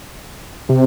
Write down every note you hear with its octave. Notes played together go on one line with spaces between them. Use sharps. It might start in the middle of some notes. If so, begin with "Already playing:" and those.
C3